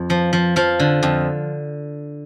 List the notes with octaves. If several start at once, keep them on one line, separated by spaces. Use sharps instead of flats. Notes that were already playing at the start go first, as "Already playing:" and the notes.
Already playing: F2
F3
F3
F3 F5
D3
F2